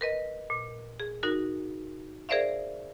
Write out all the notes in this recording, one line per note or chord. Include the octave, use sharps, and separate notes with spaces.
A#4 B4 D#5
A#2
G#4
D#4 F#4 A#4
G#4 A#4 C5 D5 E5 F5